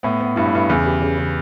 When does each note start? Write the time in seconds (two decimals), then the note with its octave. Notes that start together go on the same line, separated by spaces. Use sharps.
0.03 A2 B3
0.21 B3
0.36 G2 E4
0.46 A2
0.53 G2 E4
0.69 E2 C#3
0.86 G4
1.02 C#3
1.18 C#3